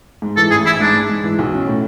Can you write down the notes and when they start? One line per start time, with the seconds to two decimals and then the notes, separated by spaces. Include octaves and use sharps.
0.22 G#2
0.37 E3 A4
0.51 A1 G#4
0.66 E3 E4
0.80 G#2 D4
0.95 G#2
1.09 G#2
1.24 E3
1.39 B1
1.53 C#4
1.67 A2